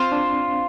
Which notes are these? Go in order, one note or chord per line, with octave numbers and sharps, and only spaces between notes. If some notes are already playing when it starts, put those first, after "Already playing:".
Already playing: C4 F4 C5 F5
D4